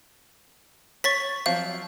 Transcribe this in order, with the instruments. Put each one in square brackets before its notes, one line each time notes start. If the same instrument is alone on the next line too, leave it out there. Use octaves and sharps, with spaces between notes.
[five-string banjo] C#5 [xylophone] C#6 A6 B6
[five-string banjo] F3 F#3 C4 [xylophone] F5